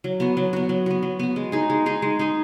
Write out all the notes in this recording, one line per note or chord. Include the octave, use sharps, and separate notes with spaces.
F#3
B3 F#4
F#3
B3 F#4
F#3
B3 F#4
F#3
B3 F#4
G#3
D#4 G#4
G#3
D#4 G#4
G#3
D#4 G#4